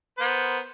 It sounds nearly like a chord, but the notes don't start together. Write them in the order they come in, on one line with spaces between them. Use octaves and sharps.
C5 B3 A#4